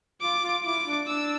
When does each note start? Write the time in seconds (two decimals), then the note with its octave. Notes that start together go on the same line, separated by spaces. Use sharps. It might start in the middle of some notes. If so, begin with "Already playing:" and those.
0.21 F4 D6
0.43 F4
0.65 E4 D6
0.86 D4
1.08 D4 E6